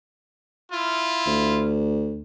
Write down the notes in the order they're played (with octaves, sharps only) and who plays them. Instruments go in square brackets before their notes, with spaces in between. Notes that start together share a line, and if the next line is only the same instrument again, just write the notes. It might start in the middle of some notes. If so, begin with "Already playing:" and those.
[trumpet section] E4 F4
[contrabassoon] D2